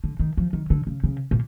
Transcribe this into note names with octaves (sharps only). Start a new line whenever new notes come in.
D3
D#3
F3
D#3
D3
C#3
C#3
A#2